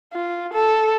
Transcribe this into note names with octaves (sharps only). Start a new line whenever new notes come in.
F4
A4